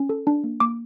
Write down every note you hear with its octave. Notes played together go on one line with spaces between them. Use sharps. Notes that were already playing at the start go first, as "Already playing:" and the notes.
Already playing: C#4
A4
D4
A#3
A#3 D6